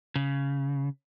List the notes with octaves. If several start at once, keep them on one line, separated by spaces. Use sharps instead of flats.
C#3